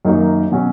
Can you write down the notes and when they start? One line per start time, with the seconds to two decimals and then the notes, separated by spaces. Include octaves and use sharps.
0.05 F#2 D#3 A#3 D#4 F#4
0.52 B2 F#3 C#4 F#4